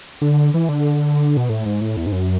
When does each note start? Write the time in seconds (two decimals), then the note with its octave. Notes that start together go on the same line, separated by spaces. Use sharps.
0.21 D3
0.54 E3
0.69 D3
1.37 B2
1.49 A2
1.66 G#2
1.81 A2
1.97 E2
2.07 G#2
2.12 F#2